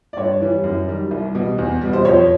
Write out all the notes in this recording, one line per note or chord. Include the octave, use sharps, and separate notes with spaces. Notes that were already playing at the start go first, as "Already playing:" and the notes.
D5
G2 C#5
E3 G3
F#2
D#3 G3
C2
B2 G3
E2
B2 G3
C5
F2 C#5